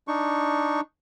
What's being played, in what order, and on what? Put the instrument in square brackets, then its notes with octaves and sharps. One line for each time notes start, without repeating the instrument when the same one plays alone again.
[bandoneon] D4 D#4 C#6